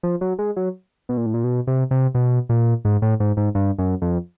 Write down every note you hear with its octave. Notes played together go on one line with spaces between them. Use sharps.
F3
F#3
G#3
F#3
B2
A#2
A2
A#2
B2
C3
C3
B2
A#2
G#2
A2
G#2
G#2
G2
F#2
F2